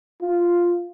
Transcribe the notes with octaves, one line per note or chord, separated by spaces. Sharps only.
F4